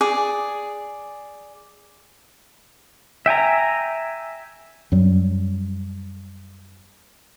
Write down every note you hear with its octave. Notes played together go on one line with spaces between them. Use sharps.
G#4 D5
E5 G5 G#5 A#5
F#2 F#3 G3